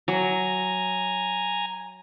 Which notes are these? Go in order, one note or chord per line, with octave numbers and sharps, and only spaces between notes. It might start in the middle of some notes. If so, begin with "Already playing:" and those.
F#3 G#5 A#5